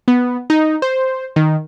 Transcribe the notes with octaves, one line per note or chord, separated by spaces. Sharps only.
B3
D#4
C5
D#3